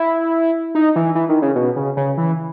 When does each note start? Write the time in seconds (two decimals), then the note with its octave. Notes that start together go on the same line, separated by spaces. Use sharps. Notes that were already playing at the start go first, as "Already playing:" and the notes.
Already playing: E4
0.75 D#4
0.96 E3
1.15 E3
1.29 D#3
1.42 C#3
1.55 B2
1.76 C#3
1.97 C#3
2.17 E3